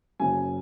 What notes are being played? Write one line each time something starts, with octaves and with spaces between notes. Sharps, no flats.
F#1 F#2 F#3 G#5